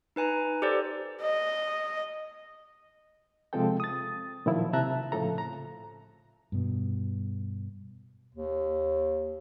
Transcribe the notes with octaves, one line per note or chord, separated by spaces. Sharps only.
D#4 B4 G#5 A#5
G4 A4 C5 D5
D#5
C3 F3 G#3 C4 A4 G5
D#6 A6
A#2 D#3 F3 F#3 E4
C3 E5 A5 A#5 F#6
A2 C#3 F3 A4 A#5
A#5
G2 B2
D#2